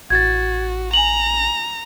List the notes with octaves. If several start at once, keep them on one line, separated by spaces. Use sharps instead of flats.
A1 F#4 G#6 A6
G#5 A#5 F7 F#7